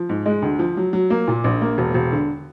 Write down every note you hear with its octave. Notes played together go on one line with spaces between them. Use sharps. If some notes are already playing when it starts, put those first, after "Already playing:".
Already playing: F3
G#2
G#3
D2
F3
F#3
F#3
A#3
A#2
A#1
A#3
E1
E1
D3